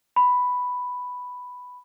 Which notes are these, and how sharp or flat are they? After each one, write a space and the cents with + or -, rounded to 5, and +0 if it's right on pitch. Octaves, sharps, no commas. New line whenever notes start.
B5 +5